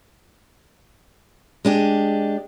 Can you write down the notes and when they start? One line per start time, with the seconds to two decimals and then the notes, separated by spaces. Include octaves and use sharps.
1.65 G#3 D4 G4